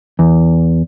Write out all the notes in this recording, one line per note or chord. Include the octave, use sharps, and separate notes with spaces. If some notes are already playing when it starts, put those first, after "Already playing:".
E2